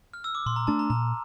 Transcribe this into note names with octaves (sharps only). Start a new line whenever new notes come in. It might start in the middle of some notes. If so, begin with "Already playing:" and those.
F6
E6
D6
A#2 C6
A#5
A3 D4 A5
A#5
A#2 A#5